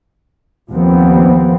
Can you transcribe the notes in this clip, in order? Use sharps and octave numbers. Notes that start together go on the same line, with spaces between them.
D#2 F3 B3 C4